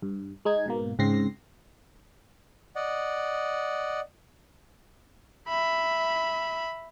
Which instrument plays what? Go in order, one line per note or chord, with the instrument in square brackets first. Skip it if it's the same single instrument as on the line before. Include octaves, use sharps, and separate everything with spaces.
[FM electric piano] G2
G#3 D#4 G#6
G#2 B2 A#3
G#2 C#3 C4 A#6 C7
[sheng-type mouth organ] D5 D#5 F#5
[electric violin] E5 B5